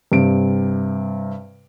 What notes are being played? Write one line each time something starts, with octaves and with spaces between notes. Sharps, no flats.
G2 C3 D7